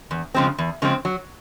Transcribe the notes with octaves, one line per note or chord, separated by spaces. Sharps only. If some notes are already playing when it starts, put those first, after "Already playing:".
E2
C#3 F3 G#3 C4
E2
C#3 F3 G#3 C4
F#3